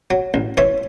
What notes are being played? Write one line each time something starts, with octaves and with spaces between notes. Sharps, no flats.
F#3
A1
E3 C#5 E5